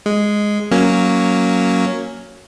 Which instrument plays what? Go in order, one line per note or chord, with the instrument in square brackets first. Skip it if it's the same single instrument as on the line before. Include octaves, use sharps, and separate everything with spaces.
[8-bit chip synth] G#3
F#3 A#3 C#4